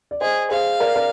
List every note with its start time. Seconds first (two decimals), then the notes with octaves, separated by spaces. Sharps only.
0.11 D5
0.21 G#4 C5 D#5
0.51 G#4 C5 F5
0.80 A#4 D5
0.96 A#4 D5